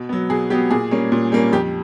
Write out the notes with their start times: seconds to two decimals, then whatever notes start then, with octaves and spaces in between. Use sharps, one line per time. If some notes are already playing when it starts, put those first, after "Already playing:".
Already playing: B2
0.09 F#3 B3
0.30 B2 G#4
0.50 F#3 B3 G4
0.71 A#2 G#4
0.91 G3 A#3 C#4
1.12 A#2
1.32 G3 A#3 C#4
1.52 F2 G4